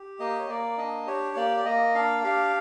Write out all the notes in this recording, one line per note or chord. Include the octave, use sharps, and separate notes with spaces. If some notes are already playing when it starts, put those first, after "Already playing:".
Already playing: G4
A#3 D#5
C#5
A#3 D5
D4 D#5
G4 C#5
A#3 D5
D5
A#3 D#5
D4 F5
G4 F5